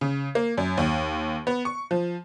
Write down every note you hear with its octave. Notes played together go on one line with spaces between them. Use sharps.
C#3
A#3
F#2
D#2
B3
C#6
F3